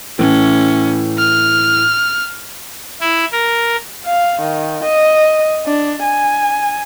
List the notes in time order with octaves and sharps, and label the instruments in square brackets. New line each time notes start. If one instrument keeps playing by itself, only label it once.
[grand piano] A2 E3 [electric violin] C#4
[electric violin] F6
[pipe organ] E4
A#4
[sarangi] F5
D#3
D#5
D4
G#5